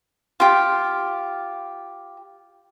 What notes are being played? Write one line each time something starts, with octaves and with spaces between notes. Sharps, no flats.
F4 G4